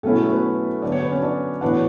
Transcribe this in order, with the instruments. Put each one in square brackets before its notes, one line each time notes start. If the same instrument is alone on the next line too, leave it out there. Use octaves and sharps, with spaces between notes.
[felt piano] B2 F#3 A3 C#4 E4 A4
A3 A4
B3 B4
D3 F#3 B3 D5
C#5
B4
C#4 C#5
D4 D5
A2 E3 B3 D4 F#4 F#5